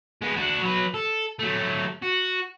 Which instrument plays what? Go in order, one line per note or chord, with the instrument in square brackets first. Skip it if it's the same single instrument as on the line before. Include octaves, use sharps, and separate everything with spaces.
[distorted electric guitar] G#3 B3
D4 F#4
F#3 B4
A4
F#3 A3
F#4